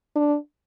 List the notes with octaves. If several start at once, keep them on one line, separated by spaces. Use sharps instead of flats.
D4